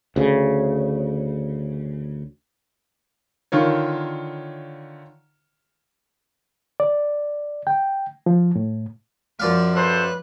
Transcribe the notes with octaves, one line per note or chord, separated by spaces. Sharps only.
D2 C#3
D3 D#3 F4 C#5
D5
G5
F3
A2
F#2 F3 D5 F5
A4 B4 C5 F#6